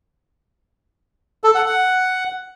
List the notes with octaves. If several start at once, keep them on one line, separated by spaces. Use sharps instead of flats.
A4
F#5
F#5